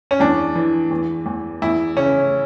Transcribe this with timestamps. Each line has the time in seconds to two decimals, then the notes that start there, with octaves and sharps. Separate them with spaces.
0.11 C#4
0.20 E2 D4
0.55 E3
0.91 E2
1.26 E2
1.62 E2 E4
1.97 C#3 C#4